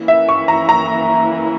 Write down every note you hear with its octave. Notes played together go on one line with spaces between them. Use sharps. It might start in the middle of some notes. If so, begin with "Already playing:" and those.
Already playing: E3 A#3 C#4 E4
E5
C#6
A#5
A#5